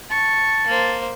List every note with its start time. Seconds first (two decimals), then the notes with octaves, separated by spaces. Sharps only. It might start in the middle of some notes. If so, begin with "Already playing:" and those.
0.11 A5 C#6
0.67 A#3 C5